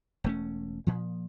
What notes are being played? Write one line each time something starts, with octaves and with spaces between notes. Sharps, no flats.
E1 A3 C#4
A#2 F3